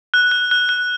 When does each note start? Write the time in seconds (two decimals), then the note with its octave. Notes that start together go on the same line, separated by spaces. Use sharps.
0.14 F#6
0.31 F#6
0.51 F#6
0.69 F#6